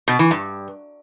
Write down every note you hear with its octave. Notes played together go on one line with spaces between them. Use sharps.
B2
E3
G2